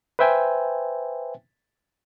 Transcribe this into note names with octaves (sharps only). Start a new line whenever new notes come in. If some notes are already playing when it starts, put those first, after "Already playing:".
B4 C5 E5 G5 G#5